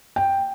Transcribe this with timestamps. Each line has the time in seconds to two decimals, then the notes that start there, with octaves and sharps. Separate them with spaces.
0.16 G5